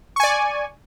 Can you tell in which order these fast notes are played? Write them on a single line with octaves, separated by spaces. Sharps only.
C#6 G#5 D5